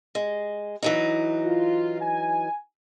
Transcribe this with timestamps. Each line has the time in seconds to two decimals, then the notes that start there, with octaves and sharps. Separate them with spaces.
0.15 G#3
0.82 E3 F#3 D#4
1.45 F4
2.01 G#5